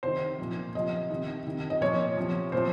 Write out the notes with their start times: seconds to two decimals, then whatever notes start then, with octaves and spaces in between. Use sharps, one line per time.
0.03 C3 D#3 C5
0.38 A#2 F3
0.75 C3 F3 D#5
1.10 C3 D#3
1.46 C3 D#3
1.70 D#5
1.81 A#2 F3 C#5
2.17 C3 F3
2.52 A#2 F3 C5